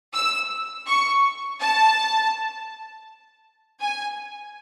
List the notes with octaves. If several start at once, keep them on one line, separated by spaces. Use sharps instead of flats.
E6
C#6
A5
G#5